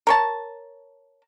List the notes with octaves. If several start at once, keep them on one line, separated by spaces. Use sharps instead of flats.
A#4 C#5 A5